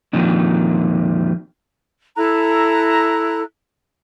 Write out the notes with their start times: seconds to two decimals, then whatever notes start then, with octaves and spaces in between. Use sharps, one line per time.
0.13 F2 A#2 D#3
2.15 E4 A4 A#5 F#6